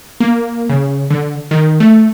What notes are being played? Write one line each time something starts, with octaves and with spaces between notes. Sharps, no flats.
A#3
C#3
D3
D#3
A3